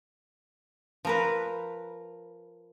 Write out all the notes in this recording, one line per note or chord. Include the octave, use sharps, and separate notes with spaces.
F3 A#4 B4